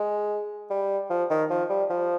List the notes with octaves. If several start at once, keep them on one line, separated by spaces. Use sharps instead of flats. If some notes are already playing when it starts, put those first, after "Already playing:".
Already playing: G#3
G3
F3
D#3
F3
G3
F3